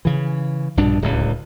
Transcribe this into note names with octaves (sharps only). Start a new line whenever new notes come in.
C#3 E3
A#1 G2 B2 D4
D1 C#2